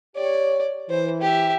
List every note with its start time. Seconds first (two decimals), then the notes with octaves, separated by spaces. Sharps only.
0.16 G4 C#5 D5
0.89 E3 C5
1.21 G4 E5